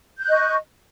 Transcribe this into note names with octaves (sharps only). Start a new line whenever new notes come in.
D#5 C#6 F#6 G6